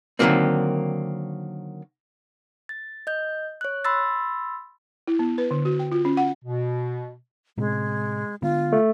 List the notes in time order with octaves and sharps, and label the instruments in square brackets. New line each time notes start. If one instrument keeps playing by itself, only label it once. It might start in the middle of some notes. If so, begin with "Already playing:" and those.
[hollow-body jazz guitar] D3 D#3 F3 F#3 A#3 C4
[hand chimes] A6
D#5 G6
C#5 F#6
B5 C6 E6 A6
[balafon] E4
B3
B4
D3
F#4
G5
F4
C#4
F#5
[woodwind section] B2
[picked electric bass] A2 C3 C4 [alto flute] G#3
[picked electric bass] D3 G#3 B3 [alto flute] F4
[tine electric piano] A3